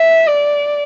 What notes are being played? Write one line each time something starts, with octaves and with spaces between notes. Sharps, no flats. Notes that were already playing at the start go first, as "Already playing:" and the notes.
Already playing: E5
D5